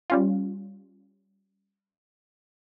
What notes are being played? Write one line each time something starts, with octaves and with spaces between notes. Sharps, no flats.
G3 C#4 F4